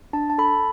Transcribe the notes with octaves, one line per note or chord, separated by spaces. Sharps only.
D4 A5
A5
A4 B5